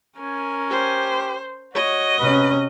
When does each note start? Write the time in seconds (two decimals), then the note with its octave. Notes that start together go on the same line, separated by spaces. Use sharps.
0.19 C#4 A#4 G#5
0.70 G4 C5
1.75 F#4 C#5 D#5
2.19 C3 C#4 B4